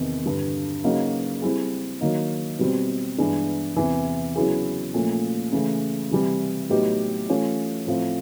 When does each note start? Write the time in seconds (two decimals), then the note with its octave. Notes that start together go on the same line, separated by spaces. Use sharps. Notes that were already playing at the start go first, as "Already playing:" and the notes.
Already playing: E2 C3 D#3
0.26 G2 D3 G3
0.84 C#3 F#3 A#3 D#4 F#4
1.42 G3 C4 E4 G#4
2.01 D#3 F#3 A#3 D#4
2.59 B2 G3 C4
3.18 G2 E3 G#3 B3 D4
3.76 E2 C3 E3
4.36 C#3 F#3 B3 E4 G#4
4.94 A#2 F3 A3 C#4
5.52 C#3 E3 A3
6.11 C3 E3 G3
6.70 A2 F#3 B3 D#4 G4
7.29 E3 A3 C#4 F4
7.87 A2 F3 A3 C4